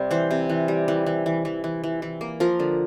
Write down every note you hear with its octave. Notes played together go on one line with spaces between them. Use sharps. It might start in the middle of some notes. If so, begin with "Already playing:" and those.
Already playing: C3 G3
E3 C5
C3
E3
G3
E3
E3
E3
E3
E3
E3
E3
A#3
F3 A#4
D3